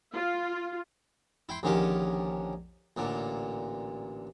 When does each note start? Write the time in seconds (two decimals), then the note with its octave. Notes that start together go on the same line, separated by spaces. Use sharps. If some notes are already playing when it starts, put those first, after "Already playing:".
0.13 F4
1.49 E4 G5 C6
1.63 A#1 D3 D#3 C#4 G4
2.97 A1 A#2 D3